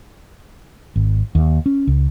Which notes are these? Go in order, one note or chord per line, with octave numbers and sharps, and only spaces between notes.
G#1
D#2
C#4
C#2